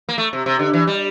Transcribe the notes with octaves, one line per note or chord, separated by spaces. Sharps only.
A#3
A3
C3
C3
D3
E3
G3